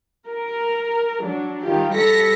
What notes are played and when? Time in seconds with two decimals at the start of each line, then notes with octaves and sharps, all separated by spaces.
0.28 A#4
1.20 F#3 D4
1.64 D#3 G3 F4 G4
1.94 G3 A4 A#6 B6 C#7